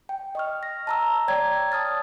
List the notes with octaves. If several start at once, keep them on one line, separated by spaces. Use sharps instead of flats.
G5
D#5 C#6 F6
A#6
A5 A#5 E6
C#5 D5 G5 A#5 G#6
A5 D#6 F6 A6